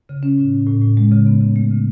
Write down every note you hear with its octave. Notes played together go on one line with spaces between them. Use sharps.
C#3
C#4
A2
A2
A2
A2
G#3
C#3
B3
C#3
A3
C#3